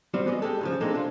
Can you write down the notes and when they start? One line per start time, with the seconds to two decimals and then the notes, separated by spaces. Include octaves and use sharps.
0.14 G3 C4 F4 F#4
0.26 G#3 B3 D5 D#5
0.42 G#3 G4 A4
0.61 G#2 C#3 F3
0.81 G#3 A#3 C4 D4 D#4 A4
0.93 C3 D4 F4